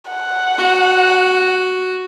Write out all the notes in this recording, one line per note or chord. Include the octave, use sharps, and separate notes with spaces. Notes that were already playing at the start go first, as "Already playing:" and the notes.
F#5
F#4